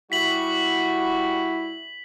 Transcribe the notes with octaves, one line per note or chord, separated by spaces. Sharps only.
G3 E4 F#4 B6 F#7